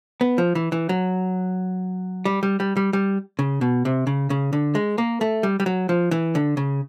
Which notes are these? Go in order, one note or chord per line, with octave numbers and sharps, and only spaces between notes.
B3
F3
E3
E3
F#3
G3
G3
G3
G3
G3
C#3
B2
C3
C#3
C#3
D3
G#3
A#3
A3
G3
G3
F#3
F3
E3
D3
C#3